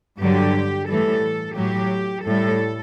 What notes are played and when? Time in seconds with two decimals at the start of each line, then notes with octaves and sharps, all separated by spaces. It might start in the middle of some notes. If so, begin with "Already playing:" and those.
0.19 G2 D3 F#3 G4
0.87 A2 E3 G3 A4
1.55 A2 F#3 G4
2.24 A2 G3 A4